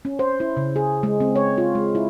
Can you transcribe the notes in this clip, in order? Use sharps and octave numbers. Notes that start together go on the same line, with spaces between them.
C#4
C5
E4
C#3
G#4
G#3
C4
C#5
F4
G#3
E4